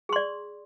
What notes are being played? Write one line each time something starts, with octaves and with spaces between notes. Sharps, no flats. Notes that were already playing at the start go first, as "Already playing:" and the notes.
G#4 D5 C6